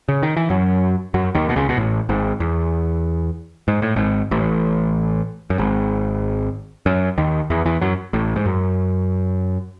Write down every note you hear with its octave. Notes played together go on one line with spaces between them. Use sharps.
C#3
D#3
E3
F#2 F#3
F#2 F#3
D#2 D#3
B2
C#2 C#3
B2
A1 A2
G#1 G#2
E2
G#2
A2
G#1 G#2
A1 A2
F#2
G#1 G#2
F#2
D#2 D#3
E2 E3
E2 E3
F#2 F#3
A1 A2
G#2
F#2